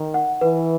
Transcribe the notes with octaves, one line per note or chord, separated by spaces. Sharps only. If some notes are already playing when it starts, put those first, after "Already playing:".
Already playing: D#3
F#5
E3 B4